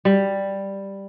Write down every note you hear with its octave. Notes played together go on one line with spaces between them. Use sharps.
G3